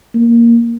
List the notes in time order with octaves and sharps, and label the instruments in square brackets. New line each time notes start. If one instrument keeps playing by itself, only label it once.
[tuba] A#3